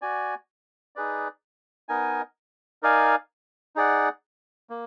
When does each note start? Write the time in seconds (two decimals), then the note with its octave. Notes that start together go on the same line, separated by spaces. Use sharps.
0.02 F#4 D5 G#5
0.96 D#4 G#4 B4 D5
1.89 B3 D#4 A#4 D#5 G#5
2.82 D#4 A#4 D5 F5 G#5
3.76 D#4 G#4 D5 F#5
4.70 A#3